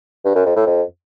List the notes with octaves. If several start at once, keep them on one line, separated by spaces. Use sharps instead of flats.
G2
F#2
F2
A2
F2